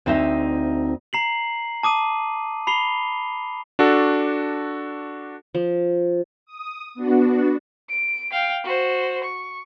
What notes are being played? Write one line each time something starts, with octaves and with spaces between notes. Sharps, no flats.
D2 C4 D#4 D#5 E5
A#5 C7 F#7
A5 D6 D#6 D#7
B5 C7 F7 G7
D4 F#4 A4
F3
D#6
B3 D4 F#4
D7
F5 G5
F#4 C5
C#6